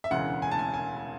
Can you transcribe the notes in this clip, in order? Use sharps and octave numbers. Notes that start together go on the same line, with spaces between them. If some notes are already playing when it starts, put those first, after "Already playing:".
E5
E1 D2 C#3 E3 F#5
G#5
A5
G#5
G#5